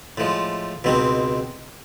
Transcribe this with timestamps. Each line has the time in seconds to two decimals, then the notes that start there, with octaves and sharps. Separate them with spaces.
0.18 A2 F3 G#3
0.84 C#2 B2 G#3 C4 D#4